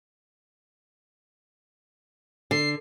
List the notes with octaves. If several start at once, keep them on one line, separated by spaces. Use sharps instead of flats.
D3 C7